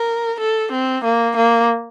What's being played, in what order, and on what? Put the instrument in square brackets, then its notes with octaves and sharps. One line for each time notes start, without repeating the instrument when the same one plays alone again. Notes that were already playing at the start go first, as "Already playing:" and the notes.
Already playing: [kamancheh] A#4
A4
C4
A#3
A#3